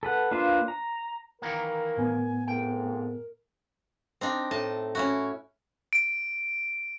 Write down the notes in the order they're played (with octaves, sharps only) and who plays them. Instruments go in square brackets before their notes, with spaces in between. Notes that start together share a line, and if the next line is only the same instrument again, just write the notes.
[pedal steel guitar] A4 B4 F#5
A#3 D4 F4 B4 C5
A#5
[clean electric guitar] D#3 E3 A#3 [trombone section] A#4 [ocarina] A#5
[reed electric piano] A2 B3 [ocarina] G#5
[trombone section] F2 G#2 A3 [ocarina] A#4 [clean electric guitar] G5
[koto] C4 D4 D#4
A2 D#5 A5
C#4 E4 F#4
[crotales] D7